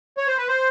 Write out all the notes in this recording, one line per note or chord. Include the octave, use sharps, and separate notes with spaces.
C#5
C5
B4
C5